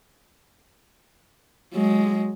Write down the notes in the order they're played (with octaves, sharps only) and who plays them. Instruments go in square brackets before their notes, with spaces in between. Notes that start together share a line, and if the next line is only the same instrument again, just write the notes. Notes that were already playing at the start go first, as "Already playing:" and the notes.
[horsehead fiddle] F#3 G#3